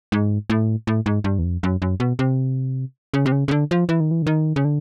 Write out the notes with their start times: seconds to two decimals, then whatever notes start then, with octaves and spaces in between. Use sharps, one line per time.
0.12 G#2
0.50 A2
0.87 A2
1.06 G#2
1.24 G2
1.39 E2
1.44 F2
1.63 F#2
1.82 F#2
2.00 B2
2.19 C3
3.14 C#3
3.26 C3
3.32 C#3
3.48 C#3
3.51 D3
3.71 F3
3.89 E3
4.00 D#3
4.11 E3
4.22 D3
4.27 D#3
4.56 C#3
4.65 D3